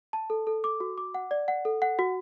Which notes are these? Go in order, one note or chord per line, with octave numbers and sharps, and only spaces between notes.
A5
A4
A4
D6
F#4
D6
F#5
D5
F#5
A4
F#5
F#4